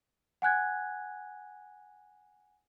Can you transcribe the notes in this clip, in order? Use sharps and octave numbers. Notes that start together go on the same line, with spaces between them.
F#5 G#5 F#6 G#6